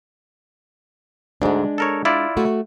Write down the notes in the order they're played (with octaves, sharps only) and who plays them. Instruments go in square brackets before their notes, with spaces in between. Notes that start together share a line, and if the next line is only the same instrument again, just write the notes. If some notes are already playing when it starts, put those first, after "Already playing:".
[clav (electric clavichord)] D2 G#2 [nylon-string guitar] G#3 D4
[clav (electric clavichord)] A4 A#4 C#5
E4 F4 D5
[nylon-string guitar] A3 F#4